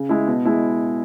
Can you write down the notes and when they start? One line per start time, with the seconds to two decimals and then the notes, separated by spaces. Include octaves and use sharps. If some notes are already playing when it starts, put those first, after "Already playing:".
Already playing: C#3
0.09 G#3 E4
0.28 B2
0.45 G#3 E4